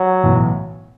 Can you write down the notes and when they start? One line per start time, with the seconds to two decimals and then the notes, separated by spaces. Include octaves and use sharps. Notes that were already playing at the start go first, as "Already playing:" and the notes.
Already playing: F#3
0.24 B1 A2 E3